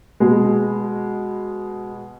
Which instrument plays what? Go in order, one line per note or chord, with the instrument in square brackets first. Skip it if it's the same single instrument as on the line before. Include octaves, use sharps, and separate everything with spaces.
[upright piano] B2 G#3